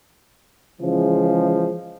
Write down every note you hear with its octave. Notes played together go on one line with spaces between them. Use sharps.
C#3 E3 F3 G#3